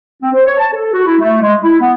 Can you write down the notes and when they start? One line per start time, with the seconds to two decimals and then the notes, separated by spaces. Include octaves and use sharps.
0.21 C4
0.33 C5
0.45 C#5
0.58 A5
0.72 A4
0.93 F#4
1.05 E4
1.19 A3
1.42 G#3
1.62 E4
1.81 B3